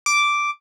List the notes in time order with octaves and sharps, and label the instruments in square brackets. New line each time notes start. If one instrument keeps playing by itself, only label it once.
[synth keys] D6